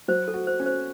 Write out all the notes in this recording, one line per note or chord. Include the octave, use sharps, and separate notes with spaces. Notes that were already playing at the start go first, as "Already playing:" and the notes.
F#3 C5
A4
F#4
C5
C#4
C5